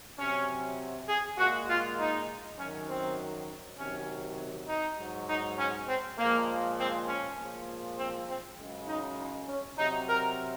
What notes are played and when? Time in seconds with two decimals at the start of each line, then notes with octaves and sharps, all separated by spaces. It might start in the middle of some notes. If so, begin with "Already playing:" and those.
0.18 C3 F#3 C#4
1.09 G#4
1.38 A#2 G#3 F#4
1.69 F4
1.99 D#4
2.58 F#2 D#3 F#3 C#4
2.89 C4
3.78 C3 D#3 F#3 C#4
4.68 D#4
4.98 G#2 F#3
5.28 D#4
5.58 C#4
5.88 C4
6.18 A#2 F3 G#3 A#3
6.78 C4
7.08 C#4
7.38 A#2 F3 G#3
7.98 C4
8.28 C4
8.58 F#2 C#3 G#3
8.88 D#4
9.18 D#4
9.48 C#4
9.78 C3 F#3 D#4
10.08 A#4